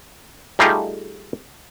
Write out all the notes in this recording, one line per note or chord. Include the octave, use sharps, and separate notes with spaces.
G3 A3 D#4 F4 G4 G#4